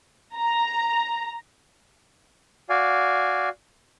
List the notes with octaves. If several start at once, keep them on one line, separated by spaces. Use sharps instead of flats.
A#5
F#4 D5 F5 G#5